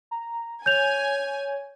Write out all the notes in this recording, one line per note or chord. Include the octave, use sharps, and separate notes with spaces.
A#5
C#5 G#5 G6 F7